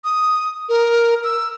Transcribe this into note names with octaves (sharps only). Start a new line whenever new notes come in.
D#6
A#4
E6